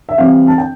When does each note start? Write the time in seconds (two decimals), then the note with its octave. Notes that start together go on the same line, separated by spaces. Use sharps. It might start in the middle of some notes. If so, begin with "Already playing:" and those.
0.09 E5
0.18 E3 G3 C4 F5
0.47 A5
0.58 G5